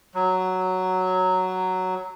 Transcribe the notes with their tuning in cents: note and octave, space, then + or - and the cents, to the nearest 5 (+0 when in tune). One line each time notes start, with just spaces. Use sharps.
F#3 +5